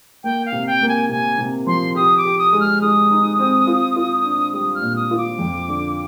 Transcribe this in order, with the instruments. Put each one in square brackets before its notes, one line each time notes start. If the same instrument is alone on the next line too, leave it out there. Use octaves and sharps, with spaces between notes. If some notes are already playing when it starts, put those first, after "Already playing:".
[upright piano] A#3 [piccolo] G5
[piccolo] F5
[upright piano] C3
[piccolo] G5
[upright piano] A#3
[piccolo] G#5
[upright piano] C3 [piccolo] G#5
[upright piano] C3
[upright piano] F3 [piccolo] C6
[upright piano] G4 [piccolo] D#6
[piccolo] D6
[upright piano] G4
[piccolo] D#6
[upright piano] G#3
[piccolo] F6
[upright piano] G#3 [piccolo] D#6
[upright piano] D#4
C4
F4
F4
D4
[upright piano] G3 [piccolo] D#6
[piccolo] F6
[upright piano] A#2
[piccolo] D#6
[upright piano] F4
[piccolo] D6
[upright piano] F2
D3